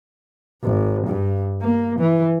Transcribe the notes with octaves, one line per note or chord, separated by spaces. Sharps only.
G#1
G2
A#3
E3